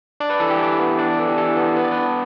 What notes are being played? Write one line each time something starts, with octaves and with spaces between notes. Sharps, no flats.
D4 D5
B4
E3 A4
G4
E3 E4
B3
D4 D5
E3 A4
G4
E3 A4
B3
B3 B4
D5
D4 B4